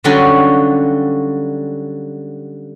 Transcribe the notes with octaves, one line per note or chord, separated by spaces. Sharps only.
D3 F#3 G3 C#4 F4 F#4